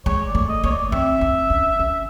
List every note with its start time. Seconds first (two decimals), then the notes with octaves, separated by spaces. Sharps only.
0.06 G#3 C#5
0.27 D5
0.35 A3
0.49 D#5
0.64 A#3 C#5
0.71 D5
0.92 C4 E5
1.21 C4
1.50 C#4
1.79 C#4